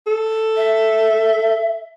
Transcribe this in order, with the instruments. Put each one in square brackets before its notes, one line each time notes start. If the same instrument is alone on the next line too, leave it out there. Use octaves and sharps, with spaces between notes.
[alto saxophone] A4
[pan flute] E5